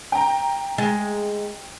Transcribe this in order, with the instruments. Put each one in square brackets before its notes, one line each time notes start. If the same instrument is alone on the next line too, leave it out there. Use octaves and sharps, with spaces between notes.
[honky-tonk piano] G5 A#5
[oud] G#3